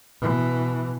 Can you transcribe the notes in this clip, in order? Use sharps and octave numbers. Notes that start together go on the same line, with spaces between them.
B2 E3